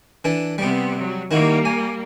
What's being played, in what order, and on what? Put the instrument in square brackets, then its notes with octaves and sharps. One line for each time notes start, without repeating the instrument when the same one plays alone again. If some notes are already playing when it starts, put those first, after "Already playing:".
[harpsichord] E3 D4 A4
[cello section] C3 B3 [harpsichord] G3 G4
[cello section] F#3
[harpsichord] D#3 E4 F#4 [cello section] G3 A#3
[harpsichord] G#5